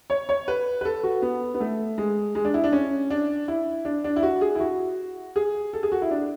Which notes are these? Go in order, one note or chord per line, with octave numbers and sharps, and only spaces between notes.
C#5
C#5
B4
B4
A4
F#4
B3
B3
A3
G#3
G#3
D4
E4
D4
C#4
D4
E4
D4
D4
E4
F#4
G#4
E4
F#4
G#4
A4
G#4
F#4
E4
D4